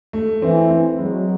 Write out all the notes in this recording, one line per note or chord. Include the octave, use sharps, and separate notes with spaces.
A3
E3 C4
C4
F#3 G#3